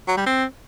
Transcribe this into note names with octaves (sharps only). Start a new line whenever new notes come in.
F#3
G3
C4